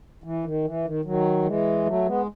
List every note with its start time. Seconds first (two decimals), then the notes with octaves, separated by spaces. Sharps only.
0.24 E3
0.45 D#3
0.65 E3
0.85 D#3
1.05 D#3 F#3
1.45 E3 G#3
1.86 F#3 A3
2.06 G#3 B3